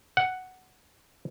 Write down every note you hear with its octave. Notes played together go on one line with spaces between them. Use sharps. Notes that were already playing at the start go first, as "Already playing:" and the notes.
F#5